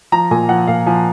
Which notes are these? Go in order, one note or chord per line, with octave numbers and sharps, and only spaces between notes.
F3 A#5
A#2 G#5
F3 F#5
A#2 F5
F3 G#5